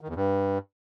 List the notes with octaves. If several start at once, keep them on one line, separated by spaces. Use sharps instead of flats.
D#3
E2
G2